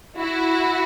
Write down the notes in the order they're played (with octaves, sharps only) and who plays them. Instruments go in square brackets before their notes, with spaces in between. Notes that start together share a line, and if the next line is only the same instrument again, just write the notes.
[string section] E4 F#4